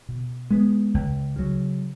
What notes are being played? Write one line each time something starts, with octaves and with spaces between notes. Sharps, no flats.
B2
G#3 B3
C#2
C#3 F#3